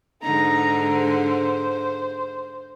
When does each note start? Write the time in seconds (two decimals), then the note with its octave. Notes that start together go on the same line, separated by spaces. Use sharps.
0.23 G#2 D3 D#4 A#5
0.93 C5